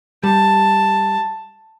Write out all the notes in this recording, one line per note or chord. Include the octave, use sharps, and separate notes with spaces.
G3 A5